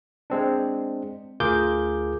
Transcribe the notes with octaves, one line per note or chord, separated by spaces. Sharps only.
G#3 C4 D4
D2 F4 G#4 A#4 D6 G6